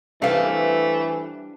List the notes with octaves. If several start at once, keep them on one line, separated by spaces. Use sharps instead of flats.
E3 G3 A3 D4 B4 C5 F5